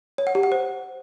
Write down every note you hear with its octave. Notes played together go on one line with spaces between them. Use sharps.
C#5
F#5
G4
F#5
C5